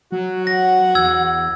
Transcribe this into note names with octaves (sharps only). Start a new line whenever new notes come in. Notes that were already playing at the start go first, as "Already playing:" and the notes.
F#3 F#4
F#5 A#6
E2 E6 G#6